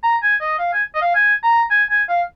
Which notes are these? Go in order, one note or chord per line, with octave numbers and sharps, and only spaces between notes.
A#5
G#5
D#5
F5
G#5
D#5
F5
G#5
A#5
G#5
G#5
F5